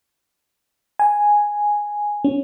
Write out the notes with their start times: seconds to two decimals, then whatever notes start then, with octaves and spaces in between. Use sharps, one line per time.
0.99 G#5
2.24 C#4